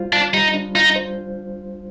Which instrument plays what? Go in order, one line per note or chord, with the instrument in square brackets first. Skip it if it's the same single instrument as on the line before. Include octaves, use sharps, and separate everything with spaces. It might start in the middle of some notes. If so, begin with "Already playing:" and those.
Already playing: [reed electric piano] G3 F4 C5
[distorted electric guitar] D4 [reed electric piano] F4
[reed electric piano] G3 [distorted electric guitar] D#4
[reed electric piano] D4
[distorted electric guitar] D#4 [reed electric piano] F4
[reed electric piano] C5